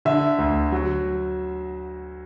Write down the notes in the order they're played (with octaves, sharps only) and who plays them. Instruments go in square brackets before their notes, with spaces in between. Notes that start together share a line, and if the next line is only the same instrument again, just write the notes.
[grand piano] D3 E5
D2
F#3